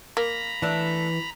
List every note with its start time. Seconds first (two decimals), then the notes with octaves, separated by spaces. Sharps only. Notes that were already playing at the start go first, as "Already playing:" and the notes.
0.17 A#3 A#5 B5
0.62 E3 A3 D4 E5